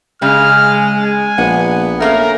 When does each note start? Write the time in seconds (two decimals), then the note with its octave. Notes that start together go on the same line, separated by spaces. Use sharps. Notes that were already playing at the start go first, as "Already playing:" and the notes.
0.22 C#3 G#3 F6
1.04 G#5
1.38 A#1 B3 F#5
2.00 A3 A#3 C#4 A#4